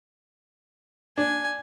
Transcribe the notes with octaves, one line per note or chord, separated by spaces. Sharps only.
D4 G#5